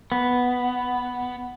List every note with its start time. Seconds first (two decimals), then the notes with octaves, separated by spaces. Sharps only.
0.12 B3